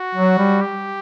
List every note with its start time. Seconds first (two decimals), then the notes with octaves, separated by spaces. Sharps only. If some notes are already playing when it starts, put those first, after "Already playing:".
Already playing: F#4
0.15 F#3
0.38 G3
0.61 G4